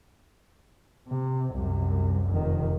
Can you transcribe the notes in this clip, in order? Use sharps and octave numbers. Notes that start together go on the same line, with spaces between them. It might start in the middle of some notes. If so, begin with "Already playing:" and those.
C3
C2 F#2
F1 D#3